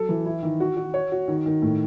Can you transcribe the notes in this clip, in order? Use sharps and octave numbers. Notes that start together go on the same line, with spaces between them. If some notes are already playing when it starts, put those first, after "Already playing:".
Already playing: F#3 A4
E3
E4
D#3
F#4
F#4
C#5
F#4
D#3
D#3
A2